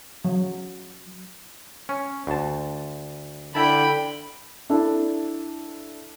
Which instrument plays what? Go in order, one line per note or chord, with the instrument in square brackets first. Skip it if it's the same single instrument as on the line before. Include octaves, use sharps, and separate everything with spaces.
[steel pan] F#3
[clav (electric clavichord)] C#4
D2 A5
[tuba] D3 [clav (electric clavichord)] E4 A5 [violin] G5 B5
[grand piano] D4 E4 A4